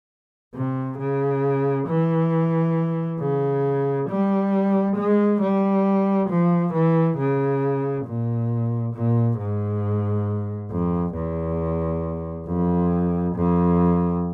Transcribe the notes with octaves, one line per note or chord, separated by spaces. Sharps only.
C3
C#3
E3
C#3
G3
G#3
G3
F3
E3
C#3
A#2
A#2
G#2
F2
E2
F2
F2